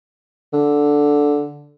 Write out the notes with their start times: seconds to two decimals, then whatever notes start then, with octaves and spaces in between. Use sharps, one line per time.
0.53 D3